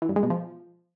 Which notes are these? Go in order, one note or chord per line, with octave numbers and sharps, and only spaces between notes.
E3
G2
G#3
B2
F3